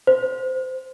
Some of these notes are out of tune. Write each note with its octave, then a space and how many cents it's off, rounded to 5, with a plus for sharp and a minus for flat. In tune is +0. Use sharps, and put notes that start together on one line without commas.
C5 -10